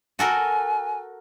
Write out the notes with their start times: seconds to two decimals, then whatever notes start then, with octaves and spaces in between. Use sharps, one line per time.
0.19 F#4 A4 A#4 G#5